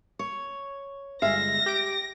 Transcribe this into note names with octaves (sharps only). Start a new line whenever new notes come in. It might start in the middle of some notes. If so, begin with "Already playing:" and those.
C#5
G1 G#3 E5 F5 A#6
G4 D7